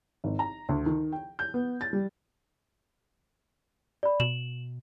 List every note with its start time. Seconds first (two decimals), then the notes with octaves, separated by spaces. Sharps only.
0.24 G#1
0.39 A#5
0.69 D2
0.86 D#3
1.12 G5
1.39 G6
1.54 B3
1.81 A6
1.93 G3
4.03 D5 B5
4.20 B2 E7 F#7